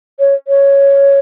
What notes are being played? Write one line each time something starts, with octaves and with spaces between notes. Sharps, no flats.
C#5
C#5